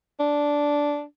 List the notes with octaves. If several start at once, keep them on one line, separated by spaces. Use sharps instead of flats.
D4